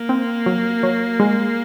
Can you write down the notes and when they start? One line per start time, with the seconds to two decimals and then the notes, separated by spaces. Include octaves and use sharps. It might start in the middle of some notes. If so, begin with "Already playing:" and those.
Already playing: A#3
0.09 C4
0.46 F#3
0.83 F#3
1.20 G#3